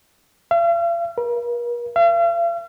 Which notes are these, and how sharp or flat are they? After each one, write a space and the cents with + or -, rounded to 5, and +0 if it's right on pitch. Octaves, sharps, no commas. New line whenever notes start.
F5 -45
A#4 +45
F5 -45